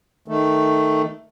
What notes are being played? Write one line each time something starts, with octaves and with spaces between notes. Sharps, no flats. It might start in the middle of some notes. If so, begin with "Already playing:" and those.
D#3 A3